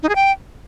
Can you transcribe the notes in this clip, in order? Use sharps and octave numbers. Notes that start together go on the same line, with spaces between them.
D#4
G#4
G5